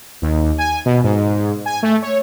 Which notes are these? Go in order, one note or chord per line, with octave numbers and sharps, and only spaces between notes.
D#2
G#5
B2
G#2
G#5
A3
C#5